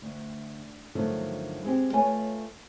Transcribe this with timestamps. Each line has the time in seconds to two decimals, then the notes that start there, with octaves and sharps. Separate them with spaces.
0.02 D2
0.95 G2 D3 D#3 F3 F#3 A3
1.64 G#3 C4 G4
1.93 A3 F4 B4 C#5 E5 G#5